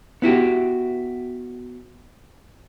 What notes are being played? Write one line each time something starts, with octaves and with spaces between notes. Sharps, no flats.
B3 E4 F#4 G4